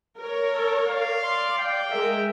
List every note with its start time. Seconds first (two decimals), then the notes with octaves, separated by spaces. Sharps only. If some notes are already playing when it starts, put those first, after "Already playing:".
0.19 A#4 C#5
0.54 A4
0.88 D5 F5
1.23 D5 C6
1.59 F5 G5
1.91 G#3 A#4 E5